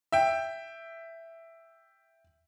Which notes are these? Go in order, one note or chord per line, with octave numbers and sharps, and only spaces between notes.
E5 G5